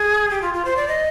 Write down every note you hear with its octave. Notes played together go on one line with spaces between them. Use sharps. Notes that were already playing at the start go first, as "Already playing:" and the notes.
Already playing: G#4
G4
F4
F4
C5
D5
D#5